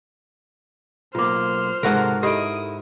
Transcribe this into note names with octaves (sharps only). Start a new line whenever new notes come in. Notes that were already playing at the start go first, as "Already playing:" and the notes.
B1 A#3 F4 C5 D6 F6
G#2 C3 F#4 A4 A#4 F#5
E4 G4 A4 D#5 D#6 D7